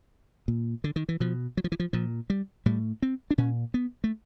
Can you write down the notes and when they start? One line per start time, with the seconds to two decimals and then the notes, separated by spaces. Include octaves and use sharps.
0.48 A#2
0.84 D3
0.96 D#3
1.09 E3
1.20 B2 F3
1.57 F#3
1.64 F3
1.72 E3
1.80 F3
1.93 A#2 F3
2.30 G3
2.66 A2 G3
3.02 C4
3.31 D4
3.38 A#2 C#4
3.74 B3
4.04 A3